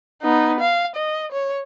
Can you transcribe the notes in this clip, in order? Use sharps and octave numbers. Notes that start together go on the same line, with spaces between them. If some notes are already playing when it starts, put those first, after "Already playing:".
B3 D#4
F5
D#5
C#5